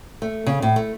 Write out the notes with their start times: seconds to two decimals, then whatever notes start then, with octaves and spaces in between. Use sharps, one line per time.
0.22 A3
0.47 C#3
0.62 A2
0.76 A3